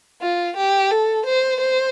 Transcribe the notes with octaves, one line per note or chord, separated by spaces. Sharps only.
F4
G4
A4
C5
C5